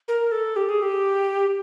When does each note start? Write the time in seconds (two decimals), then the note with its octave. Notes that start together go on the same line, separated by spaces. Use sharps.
0.08 A#4
0.32 A4
0.56 G4
0.69 G#4
0.82 G4